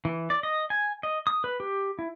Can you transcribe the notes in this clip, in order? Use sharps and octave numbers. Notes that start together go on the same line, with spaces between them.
E3
D5
D#5
G#5
D#5
D#6
B4
G4
E4